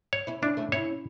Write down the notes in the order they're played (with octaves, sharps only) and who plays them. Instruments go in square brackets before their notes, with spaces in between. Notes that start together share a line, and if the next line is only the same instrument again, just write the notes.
[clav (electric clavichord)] C#5
[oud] C#4 E4
[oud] C#4 E4 [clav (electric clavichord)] D4
[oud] A3 C#4
[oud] C#4 E4 [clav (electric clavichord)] C#5